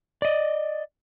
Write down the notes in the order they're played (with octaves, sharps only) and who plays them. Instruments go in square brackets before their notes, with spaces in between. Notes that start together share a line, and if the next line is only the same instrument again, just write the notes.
[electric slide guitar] D5 D#5